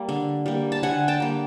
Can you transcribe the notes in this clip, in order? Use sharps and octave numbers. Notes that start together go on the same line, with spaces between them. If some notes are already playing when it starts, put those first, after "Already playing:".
Already playing: G3 A#3
D3
G3 A#3
A5
D3 F#5 G#5
G5 A5
G3 A#3